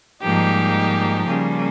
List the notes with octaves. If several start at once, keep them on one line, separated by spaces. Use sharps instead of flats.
G#2 F3 G3 A#3 D#4 G4
F3
C#3 G3 A#3